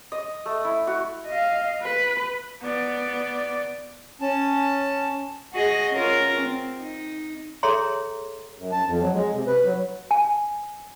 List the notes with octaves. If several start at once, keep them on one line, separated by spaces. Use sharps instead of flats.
D#5
A3
E4
F#4
D#5 F5
B4
B3 D5
C#4 A5
F#4 G#4 D#5
C#4 F4 A#4
C4
D#4
G#4 A4 C#5 E5 A#5 C6
F#2
A5
F2
F#3
G#3
C3
B4
F#3
G#5